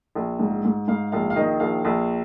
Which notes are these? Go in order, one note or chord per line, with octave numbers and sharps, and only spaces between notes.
A#1
G#2
G#2
G#2 F5
A#1 F5
F5
D#3 D#5
A#1 F5
A#1